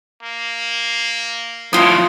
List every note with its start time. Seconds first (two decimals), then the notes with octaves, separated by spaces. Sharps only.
0.23 A#3
1.73 F2 A2 F4 D#6